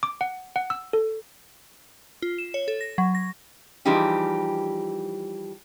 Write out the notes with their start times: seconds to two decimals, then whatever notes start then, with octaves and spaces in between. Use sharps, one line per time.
0.03 D6
0.21 F#5
0.56 F#5
0.70 E6
0.93 A4
2.22 F4
2.38 E7
2.54 C#5
2.68 A4
2.81 A#6
2.98 F#3
3.15 A#6
3.85 E3 F3 G3 D#4 G4 G#4